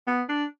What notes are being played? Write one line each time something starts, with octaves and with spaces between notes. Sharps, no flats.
B3
D4